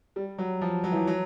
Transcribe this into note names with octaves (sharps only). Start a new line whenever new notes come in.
G3
F#3
F3
F#3
E3
F3
F#3